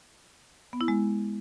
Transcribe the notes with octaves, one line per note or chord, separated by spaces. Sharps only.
B3
E4
G#3